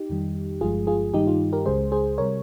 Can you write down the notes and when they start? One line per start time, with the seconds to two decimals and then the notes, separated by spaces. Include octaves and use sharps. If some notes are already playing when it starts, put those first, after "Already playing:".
Already playing: D#4 G4
0.10 F2 D#3 G3
0.61 G1 G2 F3 G#3 F4 G#4
0.87 F4 G#4
1.13 G2 D#3 G3 D#4 G4
1.27 F4
1.53 G4 A#4
1.65 C#2 C#3 G#3 G#4 C5
1.92 G#4 C5
2.18 C3 G3 A#4 C#5